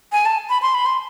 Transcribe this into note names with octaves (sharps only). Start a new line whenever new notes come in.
G#5
A5
B5
C6
B5
C6